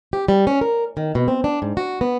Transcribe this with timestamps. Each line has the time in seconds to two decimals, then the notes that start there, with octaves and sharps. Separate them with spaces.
0.13 G4
0.28 G3
0.47 C#4
0.61 A#4
0.97 D#3
1.15 B2
1.28 C4
1.44 D4
1.62 G#2
1.77 F#4
2.01 B3